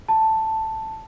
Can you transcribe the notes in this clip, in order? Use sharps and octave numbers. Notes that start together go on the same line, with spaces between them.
A5